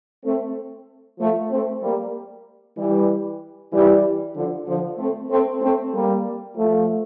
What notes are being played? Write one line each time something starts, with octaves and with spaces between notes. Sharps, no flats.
A3 C4
F3 A3
A3 C4
G3 A#3
E3 G3
E3 G3
D3 F3
D3 F3
A3 C4
A3 C4
A3 C4
G3 A#3
F3 A3